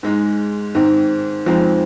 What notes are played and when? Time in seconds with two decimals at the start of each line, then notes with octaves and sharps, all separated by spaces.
0.03 G#2 G#3 D#4
0.75 G#2 D#3 C4 D#4
1.46 F2 F3 G#3 C4 D#4